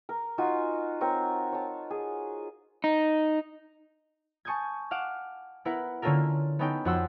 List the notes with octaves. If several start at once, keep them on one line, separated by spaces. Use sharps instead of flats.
A#4
D#4 F4 F#4 G#5
C4 A#4 C#5 C#6
C#5 A5
G#4
D#4
G#5 A5 C#6 D#6 G6 G#6
F5 F#5 D6 E7
B3 E4 A#4 B4 F#5
D3 A#3 C#4 F4 A4 A#4
B3 C#4 D#4 A4 G5
F2 F#4 F#5 C6 E6